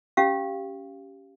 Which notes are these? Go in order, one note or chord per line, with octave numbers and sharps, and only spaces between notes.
C#4 G4 F5